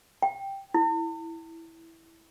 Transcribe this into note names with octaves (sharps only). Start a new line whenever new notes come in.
G5
E4